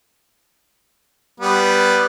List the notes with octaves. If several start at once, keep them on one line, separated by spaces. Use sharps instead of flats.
G3 B3